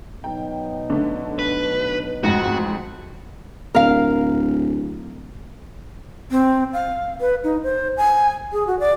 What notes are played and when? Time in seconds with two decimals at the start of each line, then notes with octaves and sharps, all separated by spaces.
0.24 B2 F#3 D#4 G5
0.90 D3 A3
1.39 B4
2.24 A1 F2 G#2 F#4
3.75 D1 A#4 F5
6.31 C4
6.73 F5
7.21 B4
7.44 D#4
7.63 C5
7.97 G#5
8.53 G#4
8.67 F#4
8.80 D5